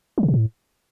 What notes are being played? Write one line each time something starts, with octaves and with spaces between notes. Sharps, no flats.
F#3
C3
B2
A2